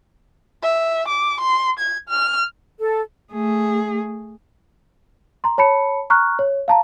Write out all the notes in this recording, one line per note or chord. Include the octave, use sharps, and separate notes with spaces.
E5
D6
C6
G#6
F6
A4
A3 G#4
A#5 C6
C#5 A5 B5 C#7
A#5 C#6 F6 F#6
C#5
F5 A5 A#5